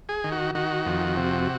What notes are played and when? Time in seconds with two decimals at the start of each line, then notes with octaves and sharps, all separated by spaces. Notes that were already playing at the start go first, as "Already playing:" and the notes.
0.09 G#4
0.24 D#3
0.32 F#4
0.55 D#3 F#4
0.86 F2
1.17 C3